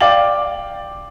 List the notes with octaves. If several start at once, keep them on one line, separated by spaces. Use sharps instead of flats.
D5 F5 G5 D6 A6 F#7